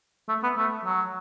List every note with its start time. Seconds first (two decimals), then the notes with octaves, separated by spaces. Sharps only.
0.29 A3
0.43 B3
0.57 A3
0.85 F#3